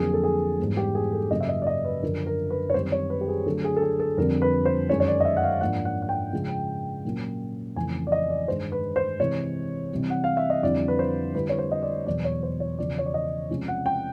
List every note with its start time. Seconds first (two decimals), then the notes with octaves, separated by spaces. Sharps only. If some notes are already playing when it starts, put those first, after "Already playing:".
Already playing: F2 D3 F#3 A#3 G#4
0.13 A4
0.24 G#4
0.59 G#2 E3 G3 B3
0.77 G4
0.95 G#4
1.13 A4
1.31 F#2 C#3 F#3 A#3 D#5
1.40 E5
1.49 D#5
1.62 D5
1.67 D#5
1.85 B4
2.02 F#2 D3 F3 A#4
2.26 A#4
2.50 B4
2.70 C#5
2.74 F#2 D#3 G3 C4 C5
2.92 C#5
3.10 B4
3.21 G4
3.28 G#4
3.46 D3 F#3 A3 A4
3.64 G#4
3.76 A4
3.82 G#4
4.00 A4
4.17 F2 D3 G3 C4 A#4
4.42 B4
4.65 C5
4.89 F#2 D#3 G#3 C#4 C#5
5.00 C#5
5.08 D5
5.20 D#5
5.25 E5
5.37 F#5
5.43 F5
5.61 G#2 F3 A#3 D4 F#5
5.85 F#5
6.02 F#5
6.09 G5
6.33 C#3 F3 G#3
7.05 A#2 F#3 A#3 C#4
7.76 F2 C#3 E3 A3 G#5
8.07 D5
8.12 D#5
8.30 D5
8.48 G2 D#3 G#3 C5
8.72 B4
8.96 C5
9.20 C3 E3 G#3 C#5
9.91 C3 E3 G3 C4
10.10 F#5
10.24 F5
10.37 E5
10.50 D#5
10.63 F2 D3 G3 C4 E4 D5
10.88 B4
10.99 C5
11.35 D3 G3 C4 E4 B4
11.49 C#5
11.58 C5
11.72 D#5
11.83 D5
12.06 E2 B2 F#3 D5
12.24 C#5
12.43 C5
12.60 C#5
12.78 E2 C#3 F3 D5
12.98 C#5
13.06 D5
13.14 D#5
13.50 C3 F3 G#3 C#4
13.68 F#5
13.86 G5